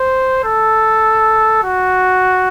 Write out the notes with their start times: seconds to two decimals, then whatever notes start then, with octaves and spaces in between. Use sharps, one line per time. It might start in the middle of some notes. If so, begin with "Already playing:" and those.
Already playing: C5
0.44 A4
1.64 F#4